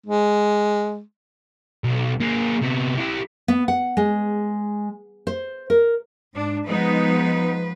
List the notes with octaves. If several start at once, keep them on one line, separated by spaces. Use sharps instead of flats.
G#3
B1
A#3 G#4
C3 B3
E4 G4
B3
F#5
G#3
C5
A#4
G#2 D4
F3 G#3 B3 D#4 B4